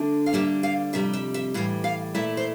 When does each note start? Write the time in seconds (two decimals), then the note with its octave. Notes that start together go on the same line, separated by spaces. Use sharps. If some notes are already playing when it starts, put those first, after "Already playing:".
Already playing: D3 A3 D4
0.26 F5
0.33 D3 G3 A#3 E5
0.63 F5
0.93 F2 C3 G3 E5
1.13 E5
1.34 E5
1.54 A2 E3 G3 F5
1.84 F5
2.15 A#2 A3 E4 E5
2.37 C5